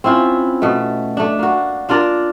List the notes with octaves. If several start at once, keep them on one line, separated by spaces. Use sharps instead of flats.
C4 C#4 E4 F4
B2 A3
A3 D4
A#3 F#4
D4 F4 A#4 D5